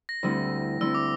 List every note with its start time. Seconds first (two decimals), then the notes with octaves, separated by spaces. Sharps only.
0.09 A#6
0.23 D2 D3 G3 C4 E4
0.81 D2 D3 G3 C4 E4 E6
0.95 D6